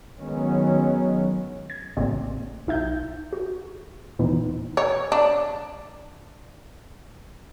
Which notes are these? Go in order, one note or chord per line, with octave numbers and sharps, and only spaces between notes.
D#3 F#3 G#3 B3 C#4
G#6
A1 C#3 A#3 C4 D5
B1 D#4 E5 G6
F#4
D#2 A#2 E3 B3 D4 D#4
C#5
D4